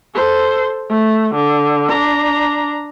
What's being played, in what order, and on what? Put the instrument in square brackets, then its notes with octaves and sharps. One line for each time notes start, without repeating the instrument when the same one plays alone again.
[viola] A4 C5
A3
D3
D4 A#5